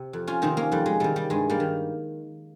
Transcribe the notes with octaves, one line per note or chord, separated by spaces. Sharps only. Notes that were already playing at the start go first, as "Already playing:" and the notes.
Already playing: C3
F2
C#4 F4
C3 D#3 C4 D#4
A#3 C#4
F2 G3
G#3
C3 D#3 G3
G3
G2 G#3
G3 A#3
D#3